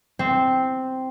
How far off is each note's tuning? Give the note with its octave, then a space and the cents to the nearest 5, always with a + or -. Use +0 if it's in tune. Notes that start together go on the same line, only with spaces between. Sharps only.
C4 -5